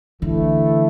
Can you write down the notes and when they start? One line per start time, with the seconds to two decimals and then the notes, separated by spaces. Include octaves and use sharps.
0.22 D3 E3 A3 E4